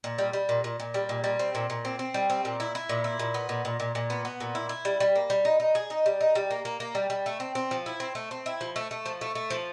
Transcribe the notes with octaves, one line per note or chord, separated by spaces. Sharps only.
A#2
G3
G3
A#2
A#2
A#2
G3
A#2
G3
C4
A#2
A#2
C4
C4
G3
C4
A#2
E4
E4
A#2
E4
A#2
B3
A#2
A#2
A#2
A#2
B3
B3
A#2
E4
E4
G3
G3
A#3
G3
D#4
D#4
G#4
D#4
G3
D#4
G3
A#3
A#3
A#3
G3
G3
A3
C4
C4
F3
E4
C4
A3
C4
E4
F3
A3
A3
F3
A3
A3
F3